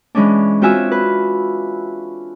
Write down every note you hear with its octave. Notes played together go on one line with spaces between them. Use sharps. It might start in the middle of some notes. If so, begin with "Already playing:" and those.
E3 G#3 C#4 D4
C4 F4 F#4 E5 G#5 E6
B4